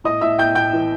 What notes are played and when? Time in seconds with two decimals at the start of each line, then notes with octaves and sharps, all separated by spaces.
0.04 A2 D#5 D#6
0.21 A2 E5 E6
0.38 A2 G5 G6
0.55 A2 G5 G6
0.73 E3